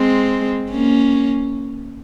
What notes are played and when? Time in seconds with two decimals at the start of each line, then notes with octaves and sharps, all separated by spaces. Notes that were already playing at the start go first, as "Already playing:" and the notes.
Already playing: G#3 C4
0.70 A#3 C#4